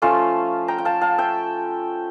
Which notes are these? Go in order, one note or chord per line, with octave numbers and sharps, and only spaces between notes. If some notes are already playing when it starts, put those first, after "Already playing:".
F3 A3 C#4 F4 F5 A5
G5 A#5
G5
F5 A5
F5 A5
E5 G5